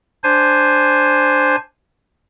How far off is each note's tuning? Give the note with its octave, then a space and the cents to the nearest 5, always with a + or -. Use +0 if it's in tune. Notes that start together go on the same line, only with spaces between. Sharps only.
D4 +0 C5 +0 G#5 +0